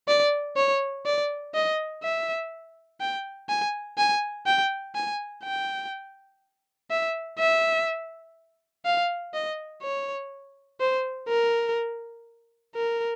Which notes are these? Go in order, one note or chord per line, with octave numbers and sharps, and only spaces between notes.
D5
C#5
D5
D#5
E5
G5
G#5
G#5
G5
G#5
G5
E5
E5
F5
D#5
C#5
C5
A#4
A#4